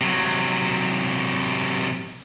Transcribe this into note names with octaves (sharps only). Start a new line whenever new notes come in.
C3 F#3